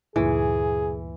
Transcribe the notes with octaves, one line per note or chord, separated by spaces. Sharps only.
D2 G2 A#2 E3 G#4